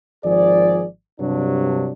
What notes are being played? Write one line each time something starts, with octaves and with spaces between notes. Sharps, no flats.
G#1 F3 G#4 D5
G2 C3 F#3 D4